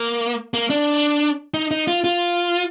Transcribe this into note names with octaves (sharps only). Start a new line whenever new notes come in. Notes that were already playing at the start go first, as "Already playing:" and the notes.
Already playing: A#3
A#3
D4
D#4
D#4
F4
F4